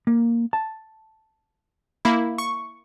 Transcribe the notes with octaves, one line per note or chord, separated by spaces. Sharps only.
A#3
A5
A#3 E4
C#6